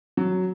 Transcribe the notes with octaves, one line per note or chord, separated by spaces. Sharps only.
F#3